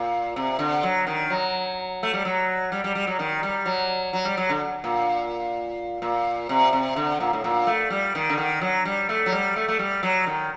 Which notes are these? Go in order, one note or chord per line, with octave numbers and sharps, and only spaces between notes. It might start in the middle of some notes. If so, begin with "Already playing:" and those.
Already playing: A#2
C3
D3
F#3
D#3
F#3
A3
G3
F#3
G3
G3
G3
F#3
D#3
G3
F#3
F#3
G3
F#3
D3
A#2
A#2
C3
C3
D3
A#2
A2
A#2
A3
G3
D#3
D3
D#3
F#3
G3
A3
F#3
G3
A3
A3
G3
F#3
D#3